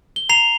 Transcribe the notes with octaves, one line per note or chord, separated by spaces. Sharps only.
G7
A#5 C7 F7